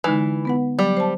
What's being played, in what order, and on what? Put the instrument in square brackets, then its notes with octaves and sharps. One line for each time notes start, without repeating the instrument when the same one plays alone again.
[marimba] D3 G#3 D#4 [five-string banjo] E3
[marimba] B3 B4 F#5
[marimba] F#3 [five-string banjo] G3
[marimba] C5 A5